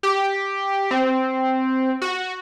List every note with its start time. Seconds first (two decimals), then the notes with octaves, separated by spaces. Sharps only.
0.03 G4
0.91 C4
2.02 F#4